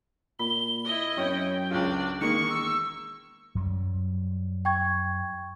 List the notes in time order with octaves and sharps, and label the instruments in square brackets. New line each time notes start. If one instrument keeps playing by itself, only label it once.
[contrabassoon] A#2 [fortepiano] B5 [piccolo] G7
[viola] E4 D#5
[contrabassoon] F#2 [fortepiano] C#4 C#5 [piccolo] G5
[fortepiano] C#2 F4 [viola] D4 D5
[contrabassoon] E1 [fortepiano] D#3 G#3 A#3 [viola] C#6 [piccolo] C#7
[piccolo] E6
[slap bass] F#2 F#3 G3
[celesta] G5 C#6 G#6